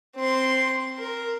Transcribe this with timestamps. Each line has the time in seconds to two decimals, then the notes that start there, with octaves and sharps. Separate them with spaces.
0.16 C4 C6
0.98 A#4